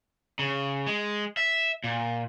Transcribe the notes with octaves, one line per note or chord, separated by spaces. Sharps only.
C#3
G#3
E5
A#2